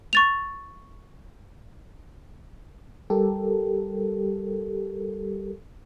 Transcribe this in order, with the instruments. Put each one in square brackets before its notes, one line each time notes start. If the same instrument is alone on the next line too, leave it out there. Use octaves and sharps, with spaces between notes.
[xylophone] C#6 A6 F7
[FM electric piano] G3 G4 A4 A#4